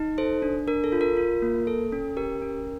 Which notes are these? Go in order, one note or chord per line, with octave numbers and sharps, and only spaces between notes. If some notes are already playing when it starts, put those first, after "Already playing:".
Already playing: D#4
A4 C5
D4
D4 A#4
A4
F4
A#4
F4
A#3
A4
C#4
G4 A#4
C#4